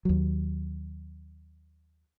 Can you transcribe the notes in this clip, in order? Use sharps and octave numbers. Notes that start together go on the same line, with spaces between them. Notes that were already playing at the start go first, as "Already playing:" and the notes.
D#2 F#3